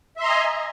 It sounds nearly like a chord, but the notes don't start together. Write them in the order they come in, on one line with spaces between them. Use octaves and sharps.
E5 C6 A#5 D#5 G#5